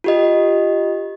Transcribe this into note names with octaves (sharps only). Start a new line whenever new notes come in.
F4 G4 D#5